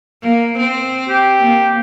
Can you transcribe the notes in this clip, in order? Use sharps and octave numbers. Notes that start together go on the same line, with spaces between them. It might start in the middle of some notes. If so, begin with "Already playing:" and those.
A#3
C4
G4
A#3